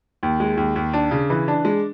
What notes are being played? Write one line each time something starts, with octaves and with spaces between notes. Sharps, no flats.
D#2
G#3
D#2
D#2
D4
C#3
E3
D4
G#3